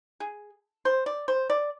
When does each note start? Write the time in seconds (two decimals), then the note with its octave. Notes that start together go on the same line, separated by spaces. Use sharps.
0.20 G#4
0.85 C5
1.06 D5
1.28 C5
1.50 D5